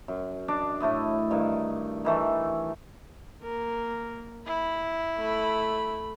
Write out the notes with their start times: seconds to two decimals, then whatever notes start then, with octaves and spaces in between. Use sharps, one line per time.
0.08 F#2
0.48 D4 D#5 D6
0.80 A2 A3 E4 D#5
1.31 G2 D#3
2.05 D#3 E3 A3
3.43 A#3 A#4
4.47 E4 B5
5.18 A3 B5